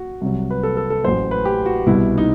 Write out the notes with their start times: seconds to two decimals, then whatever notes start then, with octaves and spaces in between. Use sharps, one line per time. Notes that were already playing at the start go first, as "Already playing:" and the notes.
Already playing: F#4
0.21 C2 C3 F#3
0.51 B4
0.63 A4
0.77 A4
0.90 A4
1.04 A1 A2 F#3 C5
1.31 B4
1.45 G4
1.66 F#4
1.86 C2 B2 G3 E4
2.18 D#4